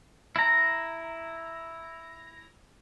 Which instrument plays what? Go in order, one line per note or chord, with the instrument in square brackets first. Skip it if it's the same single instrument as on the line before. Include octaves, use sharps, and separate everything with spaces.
[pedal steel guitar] E4 A#5